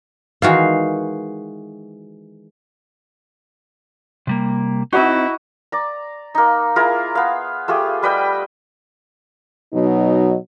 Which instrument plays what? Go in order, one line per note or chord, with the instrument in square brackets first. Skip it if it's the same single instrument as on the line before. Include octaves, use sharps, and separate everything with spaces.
[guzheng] D#3 E3 G#3 [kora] F#4 F5
[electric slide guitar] C3 G3 A#3
[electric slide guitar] C4 D#4 [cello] E4 [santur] F#4 D#5 A#5
[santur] D5 A#5
A#3 D#4
E4 F4 G#4 A#4
B3 F5
A3 F4 G4 G#4
G3 B4 D#5 G5
[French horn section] B2 F#3 D#4